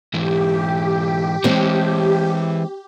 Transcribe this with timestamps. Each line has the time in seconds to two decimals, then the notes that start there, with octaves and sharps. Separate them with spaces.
0.14 G#2 E3 G4
1.44 E3 G#3 C4 C#5